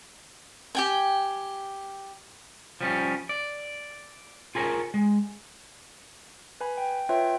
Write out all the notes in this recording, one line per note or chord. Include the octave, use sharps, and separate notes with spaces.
G4 G5 G#5
F3 G3 C#4
D5
F4 G#4 A#4 C#5
G#3
B4 G#5 B5
G5
F4 B4 C#5 E5 G5